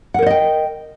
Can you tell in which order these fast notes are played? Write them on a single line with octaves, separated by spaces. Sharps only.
F#5 A#4 C5 D#5 G5